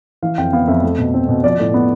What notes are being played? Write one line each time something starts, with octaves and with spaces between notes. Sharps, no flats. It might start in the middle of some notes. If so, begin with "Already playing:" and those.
E3 F5
F2 G5
B3 F5
F2 E5
A3
B2
C4
B2
F3 D5
A2
B3